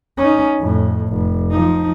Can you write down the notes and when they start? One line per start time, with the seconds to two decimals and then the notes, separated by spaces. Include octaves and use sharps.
0.18 C#4 D#4
0.60 F2 A2
1.08 F1
1.51 F3 D#4